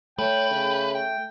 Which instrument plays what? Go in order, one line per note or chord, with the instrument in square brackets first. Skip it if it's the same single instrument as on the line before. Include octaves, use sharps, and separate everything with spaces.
[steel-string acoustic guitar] A3 [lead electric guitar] B4 [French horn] C#5 [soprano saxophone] G5
[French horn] C#3
[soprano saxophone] G5